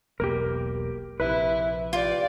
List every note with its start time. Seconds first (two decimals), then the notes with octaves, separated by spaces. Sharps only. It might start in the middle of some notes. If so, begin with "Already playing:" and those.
0.20 E1 B1 A#3 G4 A#4
1.20 A#1 C3 E4 B4
1.93 F4 G4 D5